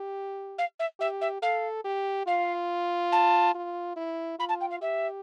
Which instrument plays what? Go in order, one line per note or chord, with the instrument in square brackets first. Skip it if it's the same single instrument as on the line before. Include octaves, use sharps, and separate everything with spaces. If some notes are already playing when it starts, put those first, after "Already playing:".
Already playing: [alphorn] G4
[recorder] F5
E5
[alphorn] G4 [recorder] E5
[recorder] E5
[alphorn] A4 [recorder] F5
[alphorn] G4
[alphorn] F4 [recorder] F5
[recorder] A5
[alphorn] F4
E4
[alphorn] F4 [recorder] B5
[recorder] A5
G5
F5
[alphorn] G4 [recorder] E5